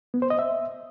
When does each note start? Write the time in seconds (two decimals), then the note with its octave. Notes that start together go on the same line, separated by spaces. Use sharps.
0.14 B3
0.22 C5
0.30 D#5
0.39 E5